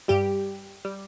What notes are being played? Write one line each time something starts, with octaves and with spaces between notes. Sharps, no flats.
G2 G3 G4
G3